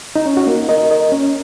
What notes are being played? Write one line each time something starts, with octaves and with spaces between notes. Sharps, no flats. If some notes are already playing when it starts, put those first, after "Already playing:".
D#4
C#4
F#4
A#3 D#4
A#4 D#5
A#4 D#5
C#4